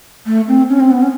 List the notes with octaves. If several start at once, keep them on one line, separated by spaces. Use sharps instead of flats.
A3
C4
C#4
C4
B3
C#4